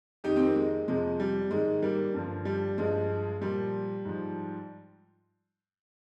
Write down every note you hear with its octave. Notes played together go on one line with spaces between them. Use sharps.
F2 D#3 D#4 G4
C4
A#3
G#3
F2 C3 F3 G#3
G3
G#2 D#3 G#3
G3 A#3
G2 D3 F3
G3
G2 F3 G#3
A#2 F3 G3
G#2 F3